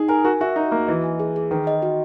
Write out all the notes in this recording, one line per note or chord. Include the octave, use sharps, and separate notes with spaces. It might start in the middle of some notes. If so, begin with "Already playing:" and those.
Already playing: D#4 G#4
A#4 G#5
F#4 A#4
F#4 E5
D#4 F#4
A#3 F#4
E3 D#5
G#5
G#4
G#4
D#3 B4
D#5
F#4